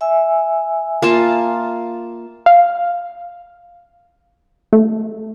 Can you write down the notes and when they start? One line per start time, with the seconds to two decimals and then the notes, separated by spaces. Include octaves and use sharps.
0.01 E5 G#5 E6
1.02 A#3 F4 A5
2.46 F5
4.73 A3